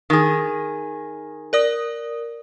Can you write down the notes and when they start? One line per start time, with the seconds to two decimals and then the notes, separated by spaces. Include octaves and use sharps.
0.10 D#3 G#4
1.53 A#4 D5 D#6